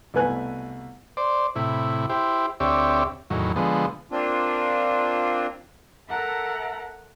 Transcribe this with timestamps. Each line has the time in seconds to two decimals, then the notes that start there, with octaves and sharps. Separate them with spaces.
0.14 C2 B2 A3 B4 G#5 F#6
1.17 C5 D5
1.56 A2 C3 E4
2.10 E4 G4 C5
2.60 D2 C4 G4 C#5 D5 E5
3.30 E2 A2 D#3 F#3
3.56 D3 F3 G#3 B3
4.11 A#3 C4 D4 F4
6.08 A4 A#4 E5 F#5 A5 A#5